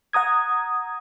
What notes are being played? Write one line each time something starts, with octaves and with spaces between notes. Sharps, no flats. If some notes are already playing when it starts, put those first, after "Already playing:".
F#5 A#5 D#6 G#6